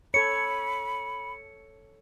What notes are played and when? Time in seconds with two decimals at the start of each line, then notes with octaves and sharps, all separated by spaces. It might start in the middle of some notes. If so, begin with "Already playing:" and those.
0.14 A4 C#5 B5 C#7